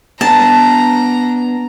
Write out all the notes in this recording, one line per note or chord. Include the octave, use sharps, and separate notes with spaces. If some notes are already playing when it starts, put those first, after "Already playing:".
B3 D4 A5 A#5